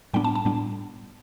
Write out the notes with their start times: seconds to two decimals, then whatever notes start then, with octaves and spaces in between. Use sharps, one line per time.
0.14 A2 G3 B3 D4 G5
0.24 A5
0.35 A5
0.45 A2 G3 B3 D4